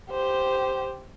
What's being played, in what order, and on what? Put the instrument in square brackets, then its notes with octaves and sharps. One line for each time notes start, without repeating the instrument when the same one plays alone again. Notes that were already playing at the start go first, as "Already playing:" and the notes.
[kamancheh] G4 C5